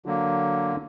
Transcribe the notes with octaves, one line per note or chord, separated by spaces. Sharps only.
D3 F#3 A#3